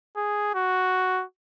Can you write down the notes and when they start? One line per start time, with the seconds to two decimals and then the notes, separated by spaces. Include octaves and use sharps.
0.16 G#4
0.55 F#4